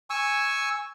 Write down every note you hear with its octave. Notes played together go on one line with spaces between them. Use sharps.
G#5 C#6 E6